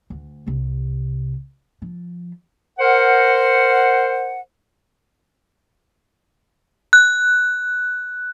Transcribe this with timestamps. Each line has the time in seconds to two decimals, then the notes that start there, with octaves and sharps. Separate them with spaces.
0.10 D2
0.47 C2 C3
1.82 F3
2.78 A#4 C5 F#5
6.93 F#6